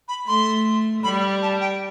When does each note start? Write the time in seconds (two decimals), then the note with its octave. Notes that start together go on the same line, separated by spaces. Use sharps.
0.08 B5
0.27 A3 C6
1.04 G3 B5
1.42 A5
1.61 G5